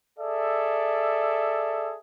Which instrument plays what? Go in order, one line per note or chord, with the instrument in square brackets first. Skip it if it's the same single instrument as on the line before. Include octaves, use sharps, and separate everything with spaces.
[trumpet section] G#4 A4 D5 E5